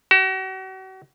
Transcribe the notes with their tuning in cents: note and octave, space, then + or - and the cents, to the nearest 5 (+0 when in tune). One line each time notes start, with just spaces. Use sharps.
F#4 +40